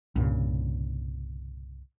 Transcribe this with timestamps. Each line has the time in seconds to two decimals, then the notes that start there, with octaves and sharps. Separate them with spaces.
0.16 C2 G2 A#2 C#3